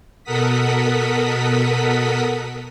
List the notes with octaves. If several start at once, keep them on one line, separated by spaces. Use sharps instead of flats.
B2 A4 A#4 F#5 D#6 B6